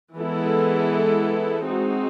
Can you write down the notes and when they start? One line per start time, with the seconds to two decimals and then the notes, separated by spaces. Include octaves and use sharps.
0.16 E3 G#3 B3 E4 A4
1.66 G#3 C4 D#4 F#4